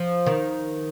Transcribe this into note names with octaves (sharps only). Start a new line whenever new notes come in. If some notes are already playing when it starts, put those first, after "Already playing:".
Already playing: F3
D#3